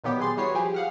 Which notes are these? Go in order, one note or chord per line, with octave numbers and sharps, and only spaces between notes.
A#2 D#3 F#3 B3 G4
G#4 C6 A6
E3 G3 F#4 B4 C#5 C7
F3 G4 G#4
F5 F#5 F6